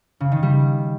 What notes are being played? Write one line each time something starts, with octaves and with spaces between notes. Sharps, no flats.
C#3
D#3
G3